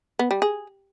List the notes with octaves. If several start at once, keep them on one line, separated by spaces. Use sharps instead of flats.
B3
G3
G#4